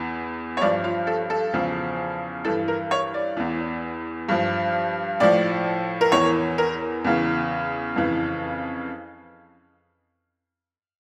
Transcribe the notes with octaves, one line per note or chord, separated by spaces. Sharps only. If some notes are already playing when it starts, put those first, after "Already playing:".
Already playing: E2 E3
C#5
G2 F3 D5
F4
A4
A4
E2 C#3 F3
G2 E3 A4
A#4
C#5
D5
E2 E3
G2 F3
A2 F3 D5
A#4
E2 E3 C#5
A#4
E2 C#3 E3
F2 C#3 E3